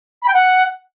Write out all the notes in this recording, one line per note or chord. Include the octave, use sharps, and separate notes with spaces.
B5
G5
F#5